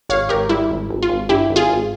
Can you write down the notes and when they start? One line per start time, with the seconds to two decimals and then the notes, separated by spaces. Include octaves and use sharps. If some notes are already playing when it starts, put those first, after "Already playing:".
0.09 G#1 C#5 F5
0.29 G#1 G4 A#4
0.49 G3 E4
0.70 G#1
0.90 G#1
1.02 F4
1.09 G#1
1.29 G2 E4 G4
1.50 G#1
1.56 F4 G#4
1.70 G#1